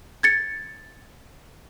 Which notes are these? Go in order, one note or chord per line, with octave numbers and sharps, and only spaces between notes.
G#6 A6 C#7